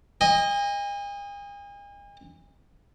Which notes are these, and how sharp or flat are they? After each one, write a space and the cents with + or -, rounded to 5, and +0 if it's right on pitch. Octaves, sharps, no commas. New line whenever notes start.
D#5 +0 G#5 -45